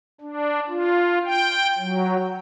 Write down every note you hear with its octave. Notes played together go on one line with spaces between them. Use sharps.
D4
F4
G5
F#3